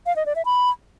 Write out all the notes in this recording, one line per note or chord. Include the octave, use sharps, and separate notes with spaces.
F5
D#5
D5
E5
B5